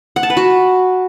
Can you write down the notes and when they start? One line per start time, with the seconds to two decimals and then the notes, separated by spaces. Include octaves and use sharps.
0.16 F#5
0.23 A5
0.30 B4
0.37 F#4